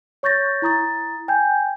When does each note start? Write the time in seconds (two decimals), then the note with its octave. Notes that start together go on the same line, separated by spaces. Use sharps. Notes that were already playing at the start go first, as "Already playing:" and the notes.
0.23 C#5 C#6 G6 A6 A#6
0.62 E4 A#5 D#6 A6
1.28 G5 G#5 G6